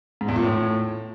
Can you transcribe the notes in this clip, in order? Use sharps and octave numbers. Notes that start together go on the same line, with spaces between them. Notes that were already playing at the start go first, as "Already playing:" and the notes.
G#2
E2
A#2
A2